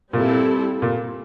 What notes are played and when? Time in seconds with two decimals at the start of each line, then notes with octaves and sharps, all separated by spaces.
0.13 A#2 G3 C4 E4 A4
0.82 A#2